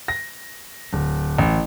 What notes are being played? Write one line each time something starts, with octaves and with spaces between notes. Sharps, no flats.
A#6
D1
A1